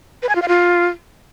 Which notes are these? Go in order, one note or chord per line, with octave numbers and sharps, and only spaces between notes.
B4
G#5
F4
F5
F4